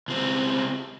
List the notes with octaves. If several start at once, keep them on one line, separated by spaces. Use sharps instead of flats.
C#2 C4